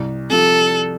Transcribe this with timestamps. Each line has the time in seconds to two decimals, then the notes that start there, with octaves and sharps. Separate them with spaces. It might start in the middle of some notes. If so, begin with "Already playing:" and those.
Already playing: C2
0.30 C3 F3 A4